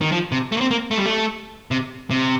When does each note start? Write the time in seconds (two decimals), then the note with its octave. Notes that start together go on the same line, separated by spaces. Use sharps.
0.01 D#3
0.12 F3
0.32 C3
0.52 A3
0.57 A#3
0.61 C4
0.71 A#3
0.91 A3
0.98 G3
1.06 A3
1.71 C3
2.11 C3